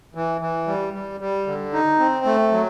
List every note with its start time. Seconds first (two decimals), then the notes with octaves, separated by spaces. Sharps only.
0.15 E3
0.41 E3
0.67 G3
0.94 G3
1.20 G3
1.47 D3
1.73 D#4
1.99 C4
2.25 A3
2.52 F#3